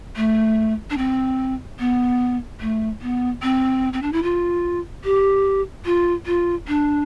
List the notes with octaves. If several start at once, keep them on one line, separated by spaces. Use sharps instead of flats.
A3
D4
C4
B3
A3
B3
C4
C4
D4
E4
F4
G4
F4
F4
D4